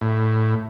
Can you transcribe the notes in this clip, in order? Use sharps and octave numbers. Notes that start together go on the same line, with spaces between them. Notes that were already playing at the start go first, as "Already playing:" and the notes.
A2